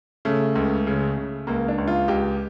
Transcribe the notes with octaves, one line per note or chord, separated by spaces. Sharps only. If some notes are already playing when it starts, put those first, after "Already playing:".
C#3 A3
C#2
C#3
C#3
C#2 A#3
D4
C#2
F4
C#2 G4